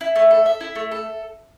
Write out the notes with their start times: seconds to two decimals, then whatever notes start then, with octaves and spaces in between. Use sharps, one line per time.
0.01 E4
0.16 A3
0.31 A4
0.46 E5
0.61 E4
0.75 A3
0.91 A4